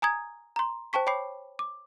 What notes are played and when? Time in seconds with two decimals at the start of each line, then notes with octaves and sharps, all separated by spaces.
0.02 G#5 A#5 D#6 G#6
0.56 A#5 C6
0.93 C5 G5 A5 C#6 B6
1.07 C#5 G5 B5 D6 C7
1.59 D6